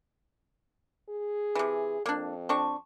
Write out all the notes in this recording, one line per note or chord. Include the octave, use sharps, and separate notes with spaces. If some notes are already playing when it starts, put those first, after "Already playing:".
G#4
C3 E3
F2 A#3 D4
C4 D4 C#6